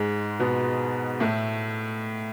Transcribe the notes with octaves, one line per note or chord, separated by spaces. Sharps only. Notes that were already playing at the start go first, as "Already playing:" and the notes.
Already playing: G#2 G#3
B2 B3
A2 A3